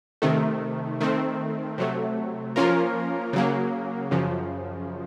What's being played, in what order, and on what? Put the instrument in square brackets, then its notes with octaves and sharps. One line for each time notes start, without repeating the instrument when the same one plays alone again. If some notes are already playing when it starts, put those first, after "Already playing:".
[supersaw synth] C3 D#3 A3
D#3 A3 C4
C3 F#3 A3
F3 A#3 C#4 F4 A#4
C#3 F#3 A#3
F#2 C#3 F3